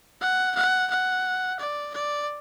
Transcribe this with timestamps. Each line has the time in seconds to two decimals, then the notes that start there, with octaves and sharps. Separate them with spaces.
0.21 F#5
0.56 F#5
0.90 F#5
1.60 D5
1.94 D5